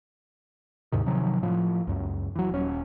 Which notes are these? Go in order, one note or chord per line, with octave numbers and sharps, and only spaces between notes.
D#2 G#2 C3 D#3
C3 D#3 F3 F#3
A2 F3
C#2 F#2
E3 F#3
D#1 C#4